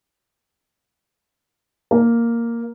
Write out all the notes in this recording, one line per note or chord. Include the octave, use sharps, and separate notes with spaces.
A#3